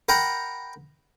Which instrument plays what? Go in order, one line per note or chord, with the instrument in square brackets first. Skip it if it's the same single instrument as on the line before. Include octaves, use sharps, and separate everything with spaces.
[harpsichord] A#4 F#5 G5 A#5 B5